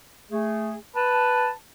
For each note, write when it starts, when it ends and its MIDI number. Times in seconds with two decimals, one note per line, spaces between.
0.31 0.76 57
0.31 0.76 68
0.96 1.50 71
0.96 1.53 81